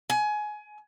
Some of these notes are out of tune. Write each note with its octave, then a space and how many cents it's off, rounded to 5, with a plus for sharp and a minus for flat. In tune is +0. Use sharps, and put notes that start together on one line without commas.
G#5 +20